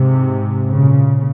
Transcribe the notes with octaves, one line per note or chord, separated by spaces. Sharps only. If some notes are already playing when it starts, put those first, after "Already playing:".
Already playing: G#2 C3
A#2 C#3